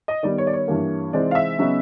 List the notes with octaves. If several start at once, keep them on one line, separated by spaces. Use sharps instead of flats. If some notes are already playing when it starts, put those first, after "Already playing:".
D#5
D#3 G3 B3 D#4 D5
C#5
D5
C#5
G2 E3 G3 A#3
C3 E3 G#3 C4 D#4 D5
F5
E5
C#3 F#3 B3 D#4